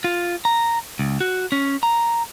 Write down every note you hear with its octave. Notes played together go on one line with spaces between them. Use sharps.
F4
A#5
C#2
F#4
C#4
A#5